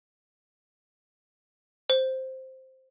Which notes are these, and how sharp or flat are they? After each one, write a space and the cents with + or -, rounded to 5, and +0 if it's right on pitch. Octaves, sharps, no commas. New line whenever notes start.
C5 +0